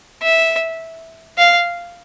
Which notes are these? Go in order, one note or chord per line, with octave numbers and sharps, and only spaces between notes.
E5
F5